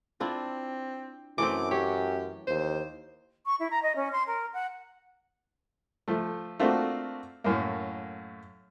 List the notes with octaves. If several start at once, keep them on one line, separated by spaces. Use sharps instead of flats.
C4 D4 E4 F4
F#2 E3 A3 C4 D6
G4 C#5
D#2 C5
C#6
E4
A#5
D#5
C#4
C6
A#4
F#5
F3 A3
A3 A#3 C4 D4 F4 F#4
F#2 A2 A#3